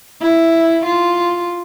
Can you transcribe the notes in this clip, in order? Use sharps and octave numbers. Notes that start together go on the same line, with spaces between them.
E4
F4